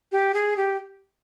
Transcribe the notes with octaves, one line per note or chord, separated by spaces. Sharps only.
G4
G#4
G4